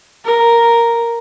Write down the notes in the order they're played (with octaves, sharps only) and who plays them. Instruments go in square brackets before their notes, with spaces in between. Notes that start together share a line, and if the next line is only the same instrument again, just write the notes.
[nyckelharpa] A#4